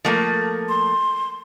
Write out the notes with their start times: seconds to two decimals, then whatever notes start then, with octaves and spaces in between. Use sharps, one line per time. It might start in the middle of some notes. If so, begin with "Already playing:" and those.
0.05 F3 A3 A#3
0.69 C6